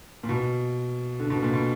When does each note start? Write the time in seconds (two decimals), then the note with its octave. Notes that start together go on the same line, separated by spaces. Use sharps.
0.23 A#2
0.29 B2
1.20 D3
1.30 B2
1.42 A#2
1.54 B2